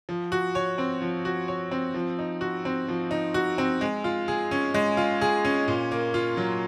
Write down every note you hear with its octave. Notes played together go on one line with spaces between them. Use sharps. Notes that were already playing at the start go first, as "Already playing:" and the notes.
F3
F#4
C#5
C4
F3
F#4
C#5
C4
F3
D#4
F#4
C4
F3
D#4
F#4
C4
G#3
F4
G#4
C#4
G#3
F4
G#4
C#4
A#2
A#3
F4
F#3